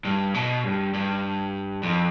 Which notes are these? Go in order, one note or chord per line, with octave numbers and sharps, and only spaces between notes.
G2
B2
G2
G2
F2